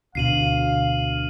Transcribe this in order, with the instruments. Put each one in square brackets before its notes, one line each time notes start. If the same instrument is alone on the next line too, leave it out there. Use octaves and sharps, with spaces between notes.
[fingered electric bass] D2 B2 D3 [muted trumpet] F5 [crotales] C7 D#7 F#7